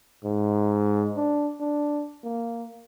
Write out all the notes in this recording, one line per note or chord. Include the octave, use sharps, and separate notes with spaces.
G#2
D4
D4
A#3